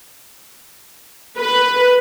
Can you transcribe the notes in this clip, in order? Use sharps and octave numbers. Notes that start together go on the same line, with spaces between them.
B4